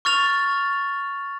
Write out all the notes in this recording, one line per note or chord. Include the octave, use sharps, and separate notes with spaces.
C#6 F6 A6 F7